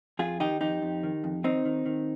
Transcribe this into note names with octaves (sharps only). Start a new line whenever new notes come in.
F2 F4 G#4
D#3 D#4 G4
F2 D#4 G4
F2
D#3
F2
D#3 C4 D#4
D#3
D#3